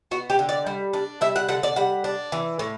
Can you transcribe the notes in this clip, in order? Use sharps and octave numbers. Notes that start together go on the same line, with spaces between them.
B3 F#4
G4
D3
D5
G3
D4
G3 E5
F#5
D3 F#5
D5
G3 F#5
D4
E3
A2